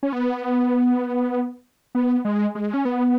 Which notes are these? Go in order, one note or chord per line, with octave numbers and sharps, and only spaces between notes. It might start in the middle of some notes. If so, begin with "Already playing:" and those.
C#4
B3
B3
G#3
G#3
C#4
B3